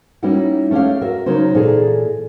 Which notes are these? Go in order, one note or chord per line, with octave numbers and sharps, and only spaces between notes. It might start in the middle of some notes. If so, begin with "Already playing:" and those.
G3 A#3 C#4 D#4 E4 F#4
A3 C#4 G4 C#5 F5
F#4 A#4 E5
C#3 F#3 D#4 A#4 C5
A#2 E3 G#4 A4 G#5